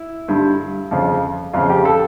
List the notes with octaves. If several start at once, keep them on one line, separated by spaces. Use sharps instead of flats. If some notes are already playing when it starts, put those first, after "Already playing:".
Already playing: E4
G2 D3 G3
F2 C#3 F3
F2 C#3 F3 F4
G4
A4